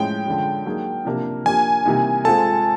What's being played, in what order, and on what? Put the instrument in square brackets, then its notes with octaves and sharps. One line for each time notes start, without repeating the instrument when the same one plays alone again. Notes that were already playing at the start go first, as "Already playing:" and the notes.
Already playing: [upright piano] A2 F3 G#3 C#4 [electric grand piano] G5
[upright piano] D3 F3 G#3 C#4
F#3 A#3 D#4 G#4
C3 F3 A#3 D4 G4
[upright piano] F3 A#3 D4 G4 [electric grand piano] G#5
[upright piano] C3 E3 G3 A#3 D#4
[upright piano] G#3 C4 F4 A4 [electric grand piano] A5